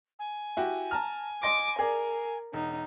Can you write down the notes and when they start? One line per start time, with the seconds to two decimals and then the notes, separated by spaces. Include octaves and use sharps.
0.19 G#5
0.57 E4 F#4 G4
0.91 A5 A#5 F6
1.43 D#5 C6 D6 A#6
1.79 G#4 A#4 D5
2.54 E1 D#4